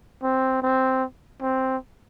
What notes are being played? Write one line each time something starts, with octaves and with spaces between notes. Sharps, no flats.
C4
C4
C4